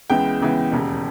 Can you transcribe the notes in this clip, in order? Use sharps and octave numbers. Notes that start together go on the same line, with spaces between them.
C#2 C#3 E3 G#3 B3 G5
C#2 C#3 E3 G#3 B3
E1 D#2 C#3